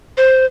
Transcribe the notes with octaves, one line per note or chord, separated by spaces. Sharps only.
C5